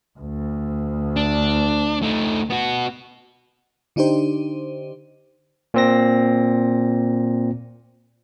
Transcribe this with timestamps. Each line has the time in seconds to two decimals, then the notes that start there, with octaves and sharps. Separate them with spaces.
0.19 D2
1.16 D4
2.03 A3 D#4
2.50 B3 F#4
3.96 D3 D4 D#4 G4 C5
5.74 A#2 C4 A#6